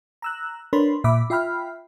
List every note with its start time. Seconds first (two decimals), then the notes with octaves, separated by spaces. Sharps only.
0.22 A#5 E6 F#6
0.73 D4 A#4 B4 C#5 B5 C6
1.04 A#2 E5 B5 D6
1.30 F4 E5 G5 B5 F6